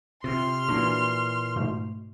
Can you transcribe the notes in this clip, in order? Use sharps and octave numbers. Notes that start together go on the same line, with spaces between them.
C3 F4 C6 F6
A#2 E3 D4 F#4
G#2 B2 A3